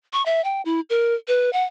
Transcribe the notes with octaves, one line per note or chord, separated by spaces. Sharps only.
C#6
E5
G5
E4
A#4
B4
F#5